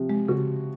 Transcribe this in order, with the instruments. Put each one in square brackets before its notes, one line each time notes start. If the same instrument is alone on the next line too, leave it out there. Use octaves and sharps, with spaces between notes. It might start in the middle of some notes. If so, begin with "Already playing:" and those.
Already playing: [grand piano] C3 F3
[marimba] G#3
[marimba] C#3 [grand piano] F#4